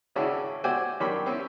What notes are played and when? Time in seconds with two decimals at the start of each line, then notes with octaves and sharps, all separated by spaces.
0.16 G#1 C#3 C#4 D4 E4 F#4
0.64 F#4 C5 D5 E5 G5 G#5
1.00 F#2 D#3 D4 G4 C#5 B5
1.26 C4 C#4 E4